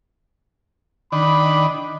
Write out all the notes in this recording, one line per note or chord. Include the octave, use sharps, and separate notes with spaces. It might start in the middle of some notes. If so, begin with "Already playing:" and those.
D#3 D4 B5